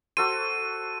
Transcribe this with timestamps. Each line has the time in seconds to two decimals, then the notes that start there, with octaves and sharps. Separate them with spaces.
0.17 F#4 A4 C5 D#7